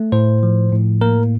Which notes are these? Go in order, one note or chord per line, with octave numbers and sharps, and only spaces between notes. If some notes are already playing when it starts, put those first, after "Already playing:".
Already playing: A3
A2 C5
F3
A2
A#3 A#4